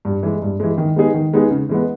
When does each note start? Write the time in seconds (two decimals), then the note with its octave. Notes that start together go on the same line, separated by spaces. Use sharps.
0.05 G2
0.23 E3 G#3
0.42 G2
0.60 E3 G#3
0.78 D#3
0.96 G#3 B3 D#4 G#4
1.14 D#3
1.33 G#3 B3 D#4 G#4
1.51 C#3
1.69 E3 G#3 B3